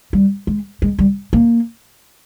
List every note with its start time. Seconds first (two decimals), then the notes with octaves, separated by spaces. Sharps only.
0.13 G3
0.47 G#3
0.82 G#3
0.99 G3
1.33 A#3